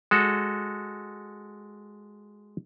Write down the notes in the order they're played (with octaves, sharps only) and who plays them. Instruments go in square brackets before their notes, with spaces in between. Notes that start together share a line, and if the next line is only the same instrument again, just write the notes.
[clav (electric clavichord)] G#3 F#4 A4